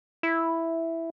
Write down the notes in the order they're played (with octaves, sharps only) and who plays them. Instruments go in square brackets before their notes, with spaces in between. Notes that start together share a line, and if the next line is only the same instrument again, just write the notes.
[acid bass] E4